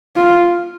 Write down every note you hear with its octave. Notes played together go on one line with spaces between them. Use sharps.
F4